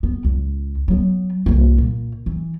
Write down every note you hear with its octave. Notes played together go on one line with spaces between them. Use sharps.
B3
C#2
F#3 B3
C2 A#3
A#2
E3